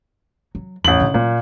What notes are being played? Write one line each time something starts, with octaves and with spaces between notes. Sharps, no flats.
F#3
A1 E2 F#7
D3 D4
A#2 F#3